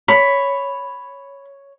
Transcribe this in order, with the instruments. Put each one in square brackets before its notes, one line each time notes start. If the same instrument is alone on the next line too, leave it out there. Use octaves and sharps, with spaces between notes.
[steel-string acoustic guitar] C#5 [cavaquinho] B5